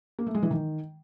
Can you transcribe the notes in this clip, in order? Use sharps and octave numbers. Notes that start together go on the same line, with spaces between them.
A#3
A3
G#3
E3
D#3